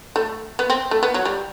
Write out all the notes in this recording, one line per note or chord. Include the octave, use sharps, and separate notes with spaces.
A3
B3
C4
A3
B3
F#3
G3